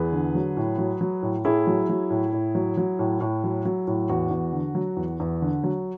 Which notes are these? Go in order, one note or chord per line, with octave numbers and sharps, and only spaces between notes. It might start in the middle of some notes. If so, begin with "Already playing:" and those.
Already playing: E2 G#4 B4
D3
F#3
A2
F#3
F#3
A2
A2 E4 G#4
F#3
F#3
A2
A2
F#3
F#3
A2
A2
F#3
F#3
A2
E2 F#4
E2
D3
F#3
E2
E2
D3
F#3